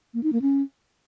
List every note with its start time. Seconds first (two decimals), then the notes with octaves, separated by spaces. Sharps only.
0.14 A#3
0.23 D#4
0.33 A#3
0.42 C#4